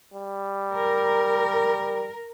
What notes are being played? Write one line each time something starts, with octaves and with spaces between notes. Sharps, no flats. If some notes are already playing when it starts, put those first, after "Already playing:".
G3
A#4